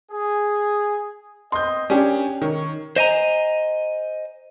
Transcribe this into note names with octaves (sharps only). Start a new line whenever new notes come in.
G#4
B3 C4 D#5 C6 G6
C#4 D4 G4 A#4 G#5
D#3 A#4 C#5
C5 D#5 G#5 A#5